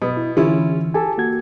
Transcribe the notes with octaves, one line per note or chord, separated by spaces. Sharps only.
B2
E4
D3 E3 C#4 E4 F4
G4 A4 G#5 A5
A#3 F#4 G#6